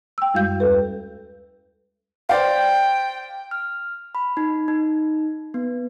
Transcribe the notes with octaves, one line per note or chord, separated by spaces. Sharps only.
G5 E6
F#2 G3 G#3 F#4 F5 G6
D#2 A4 B4
C5 D5 F5 G5
F6
B5
D#4
D#4
B3